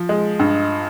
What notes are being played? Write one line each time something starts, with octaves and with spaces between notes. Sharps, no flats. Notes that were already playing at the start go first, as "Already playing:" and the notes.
Already playing: F3
G#3
G2